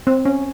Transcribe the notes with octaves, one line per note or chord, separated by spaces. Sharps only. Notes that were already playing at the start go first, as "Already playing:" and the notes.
C4
C#4